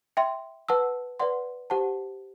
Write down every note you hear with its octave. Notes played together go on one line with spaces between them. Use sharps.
E5 G5 C6
B4 F#5 A5 E6
B4 D5 F#5 C6
G4 C5 F#5 A5